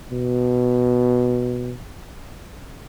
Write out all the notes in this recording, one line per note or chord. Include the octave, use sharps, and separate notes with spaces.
B2